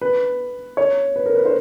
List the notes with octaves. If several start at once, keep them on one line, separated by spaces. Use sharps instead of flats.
B4
C#5
B4
A#4
B4
C5